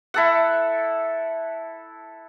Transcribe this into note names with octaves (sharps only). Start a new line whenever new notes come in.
E4 A4 F#5